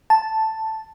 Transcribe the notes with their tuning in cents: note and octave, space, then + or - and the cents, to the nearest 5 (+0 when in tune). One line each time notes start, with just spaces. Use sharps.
A5 +0